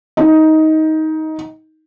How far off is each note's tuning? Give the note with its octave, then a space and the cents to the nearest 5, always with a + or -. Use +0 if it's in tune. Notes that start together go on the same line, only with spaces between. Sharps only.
D#4 +15